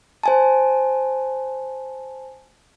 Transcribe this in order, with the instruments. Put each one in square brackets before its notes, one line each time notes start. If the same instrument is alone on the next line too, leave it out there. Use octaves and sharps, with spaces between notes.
[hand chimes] C5 G#5 A5